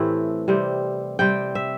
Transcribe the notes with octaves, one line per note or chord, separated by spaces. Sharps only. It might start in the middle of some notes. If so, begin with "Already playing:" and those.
Already playing: A2 E3 A3 C4 E4 G4
C3 G3 C4
C3 G3 C4 G5
E5